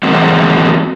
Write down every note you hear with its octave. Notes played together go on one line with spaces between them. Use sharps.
E3 F#3 G#3 A#3 C4 F#4